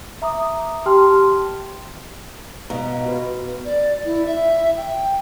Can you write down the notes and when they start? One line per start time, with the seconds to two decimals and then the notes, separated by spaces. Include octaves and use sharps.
0.22 E5 A#5 D6 D#6
0.86 G4 G5 A5 C6 F6
2.70 B2 D#5 F5 A#5
3.06 F#4 B4
3.65 D5
4.05 E4
4.26 E5
4.77 G5